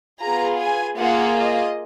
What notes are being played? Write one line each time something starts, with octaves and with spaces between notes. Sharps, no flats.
B3 F4 G#4 A#5
G#5
A#3 F4 G#4 F#5
D#5